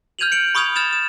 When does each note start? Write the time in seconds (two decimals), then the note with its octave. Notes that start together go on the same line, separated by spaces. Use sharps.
0.19 F6 G6 G#6 D#7 F7 F#7
0.32 C#7 D7 F#7
0.55 B5 C#6 D#6 F6 G#6 F7
0.76 F6 G#6 A6 E7 F7
0.93 E7